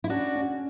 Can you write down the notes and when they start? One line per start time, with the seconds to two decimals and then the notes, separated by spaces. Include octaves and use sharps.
0.04 E4
0.09 C#4 D4 F#4
0.36 C#4